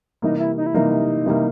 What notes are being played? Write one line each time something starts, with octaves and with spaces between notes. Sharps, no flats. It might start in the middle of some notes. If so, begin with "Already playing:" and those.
C3 E3 G3 A#3 D#4
E4
D#4
E4
C3 E3 G3 A#3 D#4
C3 E3 G3 A#3